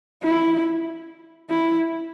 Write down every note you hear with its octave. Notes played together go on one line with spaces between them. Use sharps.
E4
E4